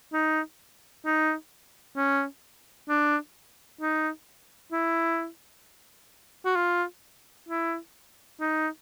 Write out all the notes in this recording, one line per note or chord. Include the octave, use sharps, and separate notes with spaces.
D#4
D#4
C#4
D4
D#4
E4
F#4
F4
E4
D#4